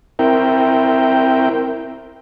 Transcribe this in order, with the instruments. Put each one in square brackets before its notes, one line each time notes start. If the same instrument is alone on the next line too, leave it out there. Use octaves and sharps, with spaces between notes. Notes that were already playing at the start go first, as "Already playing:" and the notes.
[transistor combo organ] C4 E4 A#4 G5